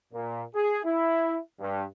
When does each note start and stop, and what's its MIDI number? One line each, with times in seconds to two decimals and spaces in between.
0.13 0.43 46
0.54 0.80 68
0.84 1.37 64
1.60 1.83 43